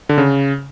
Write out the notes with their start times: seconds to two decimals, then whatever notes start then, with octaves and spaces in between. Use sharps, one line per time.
0.09 D3
0.18 C#3